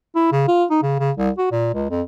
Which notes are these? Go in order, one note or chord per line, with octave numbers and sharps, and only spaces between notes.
E4
C#3
F4
D#4
C#3
C#3
C2
F#4
A#2
C#2
F2